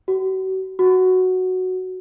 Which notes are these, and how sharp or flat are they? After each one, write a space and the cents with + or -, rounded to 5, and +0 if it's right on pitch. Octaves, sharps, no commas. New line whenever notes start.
F#4 +40
F#4 +0